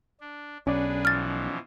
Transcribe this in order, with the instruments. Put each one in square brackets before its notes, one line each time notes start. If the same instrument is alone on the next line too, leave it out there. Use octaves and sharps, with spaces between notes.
[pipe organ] D4
[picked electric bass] B1 [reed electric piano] C#4 D5 [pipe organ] D4 G#4 B4
[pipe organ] B2 E3 F3 [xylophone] F6 A6